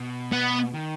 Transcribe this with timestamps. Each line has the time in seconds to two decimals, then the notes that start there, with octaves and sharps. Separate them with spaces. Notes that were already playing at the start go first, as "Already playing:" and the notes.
Already playing: B2
0.32 B3
0.74 D#3